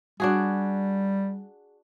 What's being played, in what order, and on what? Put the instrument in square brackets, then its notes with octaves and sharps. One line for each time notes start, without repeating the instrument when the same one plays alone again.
[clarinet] G3 [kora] D4 F#4 G#4